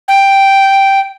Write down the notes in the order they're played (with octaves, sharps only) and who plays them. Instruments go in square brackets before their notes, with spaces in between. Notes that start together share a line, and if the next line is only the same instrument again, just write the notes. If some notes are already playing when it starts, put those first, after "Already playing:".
[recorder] G5